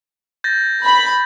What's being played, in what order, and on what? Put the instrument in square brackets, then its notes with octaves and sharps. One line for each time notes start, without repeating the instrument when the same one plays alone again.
[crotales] G6 A6 A#6
[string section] B5